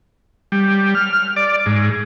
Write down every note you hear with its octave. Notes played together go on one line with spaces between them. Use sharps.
G3
F6
D5
G#2